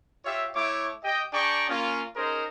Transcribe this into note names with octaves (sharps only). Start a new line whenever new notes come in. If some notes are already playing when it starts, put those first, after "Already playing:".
F4 G4 C#5 E5
A3 E4 C#5 D6
G4 D#5 G5
D4 G#4 D5 G5 A#5 C#6
A#3 C#4 F4
C#4 D#4 G#4 A#4 C5